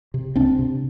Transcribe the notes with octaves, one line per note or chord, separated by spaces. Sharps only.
C3
C#2 C4 D4
C3